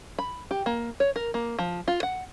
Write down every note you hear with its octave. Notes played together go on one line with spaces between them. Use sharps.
B5
G4
A#3
C#5
A#4
A#3
F3
F4
F#5